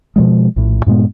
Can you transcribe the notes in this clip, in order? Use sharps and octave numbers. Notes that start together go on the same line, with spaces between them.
B2 F3 G#3
A#1 A2
G2 A#2 G#3 B3